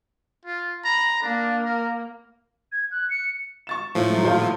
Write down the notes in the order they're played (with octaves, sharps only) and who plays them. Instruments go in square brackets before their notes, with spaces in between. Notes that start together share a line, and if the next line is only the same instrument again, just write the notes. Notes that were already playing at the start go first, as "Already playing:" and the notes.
[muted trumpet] F4
[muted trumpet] A#5 [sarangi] B5
[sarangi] A#3 [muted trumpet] D4
[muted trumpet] A#4
[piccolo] G#6
F#6
C#7
[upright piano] C#6 A6 E7
[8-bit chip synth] A2 F3
[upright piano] F#3 A3
D#1 C5 F5